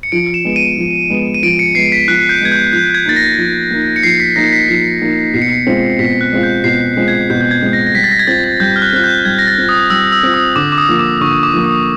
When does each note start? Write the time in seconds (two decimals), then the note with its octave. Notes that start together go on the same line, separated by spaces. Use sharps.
0.03 C#7
0.12 F3 D7
0.34 E7
0.45 G#3 B3
0.56 D#7
0.78 F3
1.10 G#3 B3
1.34 D#7
1.43 F3 D7
1.59 C#7
1.75 G#3 B3 C7
1.92 B6
2.08 F3 F#6
2.29 G6
2.40 G#3 B3 G#6
2.52 G6
2.73 F3 G6
2.95 G#6
3.06 A#3 D#4 A6
3.16 A#6
3.38 F3
3.71 A#3 D#4
3.96 C#7
4.03 F3 C7
4.20 B6
4.36 A#3 D#4 A#6
4.53 B6
4.68 F3 C7
5.02 A#3 D#4
5.34 B2 C7
5.42 C#7
5.49 C7
5.67 G#3 C4 F4
5.99 B2 B6
6.21 F#6
6.32 G#3 C4 F4
6.43 G6
6.64 B2 C7
6.97 G#3 C4 F4
7.08 G#6
7.30 B2 G6
7.41 G6
7.51 G#6
7.62 G#3 C4 F4
7.73 A#6
7.87 A#6
7.95 G3 B6
8.04 A6
8.12 A#6
8.19 G#6
8.27 C4 F4 A6
8.44 A6
8.60 G3 G6
8.76 F6
8.82 F#6
8.93 C4 F4 F#6
9.04 G6
9.25 G3 G#6
9.39 A#6
9.47 A6
9.58 C4 F4
9.69 D#6
9.90 G3 E6
10.12 E6
10.23 C4 F4
10.34 D#6
10.56 D3 D6
10.72 D6
10.78 D#6
10.89 F3 A#3
10.99 D6
11.21 D3 C#6
11.43 D6
11.54 F3 A#3
11.64 D#6